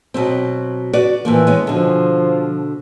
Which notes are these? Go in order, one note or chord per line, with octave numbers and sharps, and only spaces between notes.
B2 F#3 C4
F#4 B4 D5
A2 E3 F3 A#3
G#3 B3 C#4
B2 D3 F3